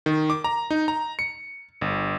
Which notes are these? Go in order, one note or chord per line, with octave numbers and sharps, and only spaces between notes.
D#3
D6
A#5
D#4
A#5
C#7
G1